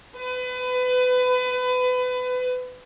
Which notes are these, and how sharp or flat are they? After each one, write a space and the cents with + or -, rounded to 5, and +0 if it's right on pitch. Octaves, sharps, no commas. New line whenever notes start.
B4 +30